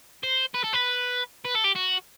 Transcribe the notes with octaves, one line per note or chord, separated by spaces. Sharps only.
C5
B4
A4
B4
B4
A4
G4
F#4